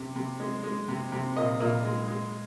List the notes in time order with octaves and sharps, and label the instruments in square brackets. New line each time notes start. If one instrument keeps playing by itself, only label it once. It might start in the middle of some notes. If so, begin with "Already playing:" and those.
Already playing: [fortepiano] C3
C3
G#3
G#3
C3
C3
A#2 D#5
A#2
G#3
G#3